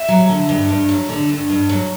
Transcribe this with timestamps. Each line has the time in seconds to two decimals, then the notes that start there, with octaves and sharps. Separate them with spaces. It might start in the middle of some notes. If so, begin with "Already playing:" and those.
Already playing: E5
0.08 F#3
0.29 D3
0.49 G2
0.69 G2
0.89 F#3
1.09 D3
1.29 G2
1.49 G2
1.69 F#3